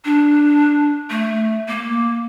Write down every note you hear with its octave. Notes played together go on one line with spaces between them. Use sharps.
D4
A3
A#3